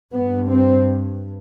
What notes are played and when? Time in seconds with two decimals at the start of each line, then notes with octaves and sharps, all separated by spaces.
0.13 G2 B3
0.48 C4